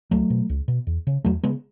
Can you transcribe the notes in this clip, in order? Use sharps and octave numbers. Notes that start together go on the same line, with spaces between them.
C#2 F#3 A3
B2
C#2
B2
E2
C#3
E2 F#3 A3
C#3 G#3 B3